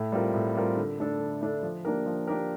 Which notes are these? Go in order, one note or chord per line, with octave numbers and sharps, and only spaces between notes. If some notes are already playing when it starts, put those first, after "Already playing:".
Already playing: A2
G3 C4 F4 A#4
A2
G3 C4 F4 A#4
D3
A3 D4 A4
D3
A3 D4 A4
F3
A#3 D4 G4 A#4
F3
A#3 D4 G4 A#4